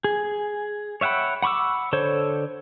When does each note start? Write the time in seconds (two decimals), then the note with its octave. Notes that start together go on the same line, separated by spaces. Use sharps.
0.04 G#4
1.01 C#5 E5 F#5 G5 B5
1.42 F#5 B5 C#6 D6 E6
1.93 D3 A4 C5 C#5